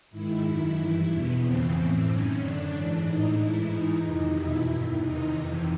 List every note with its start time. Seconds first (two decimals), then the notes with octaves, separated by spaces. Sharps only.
0.11 G#2 D#3 E4
0.44 F#2 D#3 E4
0.76 G2 E3 E4
1.09 E2 B2 B3
1.41 F2 C#3 E3 C4
1.74 A2 E3 C4
2.07 F#2 D#3 C#4
2.40 F#2 D3 D4
2.72 G#2 E3 D4
3.05 A2 E3 D#4
3.37 G#2 E3 E4
3.70 G#2 E3 D#4
4.02 F2 C3 D#3 D#4
4.35 E2 B2 E4
4.68 G2 D#3
5.01 E2 C3 D#3 D#4
5.33 F2 C3 E3